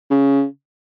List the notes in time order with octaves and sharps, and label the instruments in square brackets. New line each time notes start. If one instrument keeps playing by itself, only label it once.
[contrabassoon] C#3